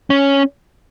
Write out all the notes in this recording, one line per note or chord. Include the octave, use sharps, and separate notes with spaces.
C#4